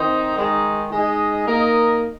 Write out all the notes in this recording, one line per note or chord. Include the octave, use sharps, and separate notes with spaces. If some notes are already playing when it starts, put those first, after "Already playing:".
Already playing: D#3 C4 D#4 C5
D#3 G#3 D#4
G#3 D#4 G#4 D#5
A#3 D#4 A#4 D#5